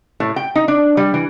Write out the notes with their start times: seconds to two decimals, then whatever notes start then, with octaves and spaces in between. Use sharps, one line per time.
0.20 A2
0.36 G5
0.55 D#4
0.68 D4
0.97 G3
1.14 E3